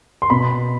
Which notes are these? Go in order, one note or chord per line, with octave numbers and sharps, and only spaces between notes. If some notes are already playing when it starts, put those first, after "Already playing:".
C6
B2 B5